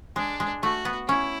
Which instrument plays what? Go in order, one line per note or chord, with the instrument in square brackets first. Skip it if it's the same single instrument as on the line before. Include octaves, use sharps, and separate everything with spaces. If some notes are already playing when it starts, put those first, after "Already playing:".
[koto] G#3 [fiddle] D4
[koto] G#3
[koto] A3 [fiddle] F#4
[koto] B3
[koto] C#4 [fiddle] E4